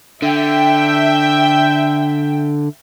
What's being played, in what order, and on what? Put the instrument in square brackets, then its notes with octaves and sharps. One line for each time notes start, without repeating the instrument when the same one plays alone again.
[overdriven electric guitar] D3 [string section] E5 G5